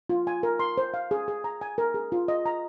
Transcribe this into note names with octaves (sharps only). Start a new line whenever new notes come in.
F4
G#5
A#4
C6
C5
F5
G#4
G#4
A#5
G#5
A#4
G#4
F4
D#5
A#5